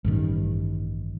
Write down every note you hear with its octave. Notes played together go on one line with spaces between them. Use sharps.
A1 G2 D#3